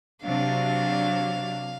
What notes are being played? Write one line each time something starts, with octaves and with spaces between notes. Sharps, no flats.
C3 F#3 D4 F5